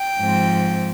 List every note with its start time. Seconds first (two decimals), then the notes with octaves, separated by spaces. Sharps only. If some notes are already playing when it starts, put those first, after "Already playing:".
Already playing: G5
0.21 G#2 F3 C4